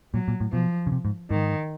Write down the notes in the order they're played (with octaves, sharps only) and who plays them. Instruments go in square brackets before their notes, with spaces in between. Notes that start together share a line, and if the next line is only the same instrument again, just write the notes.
[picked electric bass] A#2 [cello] F#3
[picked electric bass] A#2
A2
[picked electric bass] B2 [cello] F3
[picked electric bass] C#3
C3
G#2
[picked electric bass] G#2 [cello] D#3